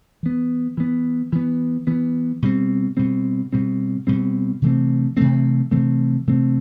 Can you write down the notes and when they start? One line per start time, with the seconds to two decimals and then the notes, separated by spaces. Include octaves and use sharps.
0.23 E3 B3
0.77 E3 B3
1.32 E3 B3
1.87 E3 B3
2.42 B2 G3 C4
2.97 B2 G3 C4
3.53 B2 G3 C4
4.07 B2 G3 C4
4.62 C3 E3 A3 C4
5.17 C3 E3 A3 C4
5.71 C3 E3 A3 C4
6.27 C3 E3 A3 C4